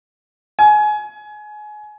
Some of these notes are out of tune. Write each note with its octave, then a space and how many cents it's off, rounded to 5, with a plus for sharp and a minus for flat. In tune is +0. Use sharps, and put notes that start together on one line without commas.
G#5 +25